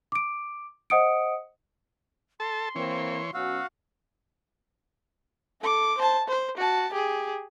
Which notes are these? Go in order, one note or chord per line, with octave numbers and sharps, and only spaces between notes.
D6 D7
C5 D#5 F#5 D#6 C#7 D7
A4 A5 C6
E3 A#3 C4 C#5
B2 F#3 C#4 F#4 F5 E6
A4 D6
C5 A5
C5
F#4 A5
G4 G#4